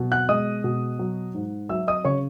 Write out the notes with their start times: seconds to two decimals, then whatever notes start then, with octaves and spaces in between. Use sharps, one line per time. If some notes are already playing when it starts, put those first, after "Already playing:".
Already playing: B2 F#3
0.12 F#5 F#6
0.29 G#3 D#5 D#6
0.64 B2
0.99 F#3
1.35 G#2
1.69 F#3 E5 E6
1.88 D#5 D#6
2.05 C#3 C#5 C#6